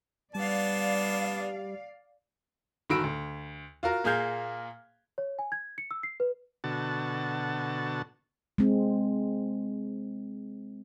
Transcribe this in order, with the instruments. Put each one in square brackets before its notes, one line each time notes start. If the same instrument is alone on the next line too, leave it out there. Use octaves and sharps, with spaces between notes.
[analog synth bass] G3 [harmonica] B3 D4 A5 [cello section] D5 F5
[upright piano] G1 D#3 F#4 B5 E6 D7
D2
F4 F#4 A#4
A#2 A#3 G#4 F6 G6 G#6
[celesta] C#5
G#5
G#6
C#7
E6
C7
B4
[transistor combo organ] B2 D3 F#4 A5
[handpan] G#3 C4